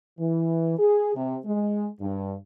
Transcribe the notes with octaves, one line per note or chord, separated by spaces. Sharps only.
E3
G#4
C3
G#3
G2